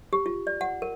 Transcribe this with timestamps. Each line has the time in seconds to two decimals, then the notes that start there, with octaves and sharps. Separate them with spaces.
0.13 G4
0.26 F4
0.47 D5
0.61 F#5
0.82 A#4